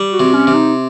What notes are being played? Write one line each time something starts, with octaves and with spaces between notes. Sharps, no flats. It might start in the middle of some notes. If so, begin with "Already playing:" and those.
Already playing: G3
F#4
C3
C#4
C3
D#4